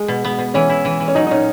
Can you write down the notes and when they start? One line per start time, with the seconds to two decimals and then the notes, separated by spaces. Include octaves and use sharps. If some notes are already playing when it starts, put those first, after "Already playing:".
Already playing: G#3
0.08 B2
0.24 B3
0.39 B2
0.54 E3 C#4
0.69 E4
0.85 E3
1.00 E3
1.08 C#4
1.15 F#3 D#4
1.27 D#4
1.31 A#2 C#4